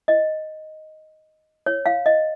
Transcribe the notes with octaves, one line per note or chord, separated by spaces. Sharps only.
D#5
C#5
F5
D#5